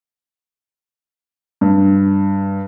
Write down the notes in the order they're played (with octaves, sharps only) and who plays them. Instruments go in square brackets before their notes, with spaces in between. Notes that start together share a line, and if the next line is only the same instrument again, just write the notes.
[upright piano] G2